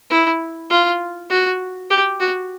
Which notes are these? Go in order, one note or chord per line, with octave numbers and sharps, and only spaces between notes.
E4
F4
F#4
G4
F#4